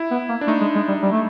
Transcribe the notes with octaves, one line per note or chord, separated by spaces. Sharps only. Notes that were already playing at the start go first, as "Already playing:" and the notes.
Already playing: E4
B3
A#3
D4
A3 D#4
G#3
G#3
G3
G3
A3